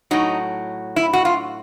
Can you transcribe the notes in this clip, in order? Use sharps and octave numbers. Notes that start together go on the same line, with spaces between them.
A2 F#3 D#4
E4
F#4
F4